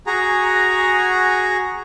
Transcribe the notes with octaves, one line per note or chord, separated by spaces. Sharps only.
F#4 G#4 A#5